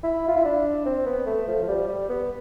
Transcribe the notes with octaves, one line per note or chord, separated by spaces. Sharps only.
E4
F4
E4
D4
C4
B3
A3
F3
F3
G3
G3
B3